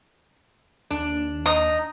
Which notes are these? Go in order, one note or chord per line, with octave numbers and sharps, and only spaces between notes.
D#2 D4
D#4 D#6